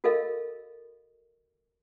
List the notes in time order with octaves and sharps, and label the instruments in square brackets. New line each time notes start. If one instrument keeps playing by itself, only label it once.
[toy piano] F#4 A4 A#4 D#5 F5